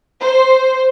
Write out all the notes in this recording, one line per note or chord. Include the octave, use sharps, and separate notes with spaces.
C5